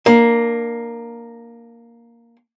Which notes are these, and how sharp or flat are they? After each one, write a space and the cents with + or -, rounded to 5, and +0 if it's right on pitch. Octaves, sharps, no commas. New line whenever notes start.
A#3 +0 D4 +30